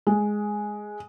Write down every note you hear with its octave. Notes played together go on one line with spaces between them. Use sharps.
G#3